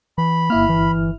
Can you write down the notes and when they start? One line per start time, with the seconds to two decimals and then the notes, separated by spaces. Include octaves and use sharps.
0.18 E3 B5
0.50 G1 A#3 E4 F6
0.69 E3